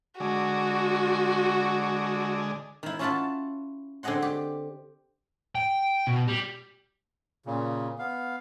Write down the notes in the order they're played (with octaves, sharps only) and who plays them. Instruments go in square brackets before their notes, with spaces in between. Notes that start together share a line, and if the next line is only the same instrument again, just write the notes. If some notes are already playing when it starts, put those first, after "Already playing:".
[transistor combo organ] D3 G#3 [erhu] F#4
[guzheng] D#3 E4
C#4 E4 F4 E5 F#5 A5
D3 C4 G#4 D#5 F#5 C6
G4
[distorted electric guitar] G5
B2
G3
[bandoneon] A#2 C#3
B3 F5